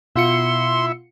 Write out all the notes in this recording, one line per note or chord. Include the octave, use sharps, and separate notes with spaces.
B2 E4 F4 E5 C6 C#7